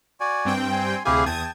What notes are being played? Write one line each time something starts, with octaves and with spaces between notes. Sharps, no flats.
F#4 D5 G#5
G2 C4 G5
G#5 C6
D2 C3 E4 G4 G#4 F5
E2 G5 A5 D#6 G#6